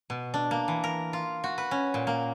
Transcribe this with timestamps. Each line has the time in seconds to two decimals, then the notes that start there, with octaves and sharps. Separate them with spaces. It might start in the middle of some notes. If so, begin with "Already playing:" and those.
0.10 B2
0.34 D4
0.51 A#3
0.68 E3
0.84 A#4
1.13 F4
1.44 F#4
1.58 B4
1.71 C#4
1.94 A#2
2.07 A#3